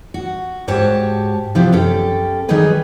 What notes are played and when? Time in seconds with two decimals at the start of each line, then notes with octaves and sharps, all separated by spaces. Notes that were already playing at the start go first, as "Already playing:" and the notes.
0.14 F#4
0.68 G#2 F#4 G4 C#5 A5
1.55 C3 F3 B3 E4 G4
1.72 F#2 C#4 G4 A4
2.48 D#3 F#3 G3 D#4 G#4 B4